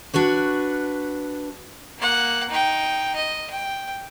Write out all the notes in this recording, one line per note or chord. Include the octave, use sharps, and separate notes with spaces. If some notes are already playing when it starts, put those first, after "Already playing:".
D4 F#4 B4 C#5
A#3 F#5
D#4 G5
D#5
G5